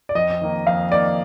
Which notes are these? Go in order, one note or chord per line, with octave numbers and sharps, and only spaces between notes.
D5
F2 D#5
D#3 A#3 D#4
F2 F5
D#3 A#3 D#4 D5